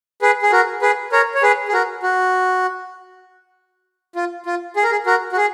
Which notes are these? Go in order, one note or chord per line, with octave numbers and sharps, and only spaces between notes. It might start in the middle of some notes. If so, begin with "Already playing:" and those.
G#4 B4
G#4
F#4 A#4
G#4 B4
A#4 C#5
C#5
G#4 B4
G#4
F#4 A#4
F#4
F4
F4
G#4
A#4
G#4
F#4 A#4
F#4
G#4